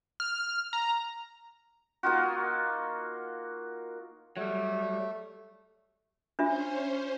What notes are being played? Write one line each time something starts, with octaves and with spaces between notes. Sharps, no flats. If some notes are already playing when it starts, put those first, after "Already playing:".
F6
A#5
A#3 D#4 F4 F#4
F#3 G3 A3
C#4 D4 F4 C5 E5